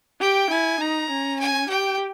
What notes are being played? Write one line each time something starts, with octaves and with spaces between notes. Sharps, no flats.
G4 G5
E4 G#5
D#4 A#5
C#4
G#5
G4 G5